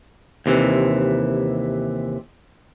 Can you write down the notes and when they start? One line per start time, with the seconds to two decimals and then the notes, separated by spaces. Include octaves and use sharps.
0.46 D#2 C3 E3